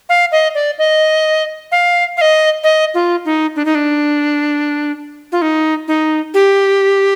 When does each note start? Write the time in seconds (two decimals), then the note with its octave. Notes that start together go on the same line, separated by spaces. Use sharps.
0.09 F5
0.32 D#5
0.55 D5
0.78 D#5
1.72 F5
2.17 F5
2.21 D#5
2.63 D#5
2.94 F4
3.25 D#4
3.56 D4
3.65 D#4
3.75 D4
5.32 F4
5.42 D#4
5.88 D#4
6.34 G4